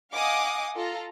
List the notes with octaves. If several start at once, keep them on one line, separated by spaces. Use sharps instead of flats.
D#5 F5 F#5 G#5 D6 D#6
F4 A4 A#5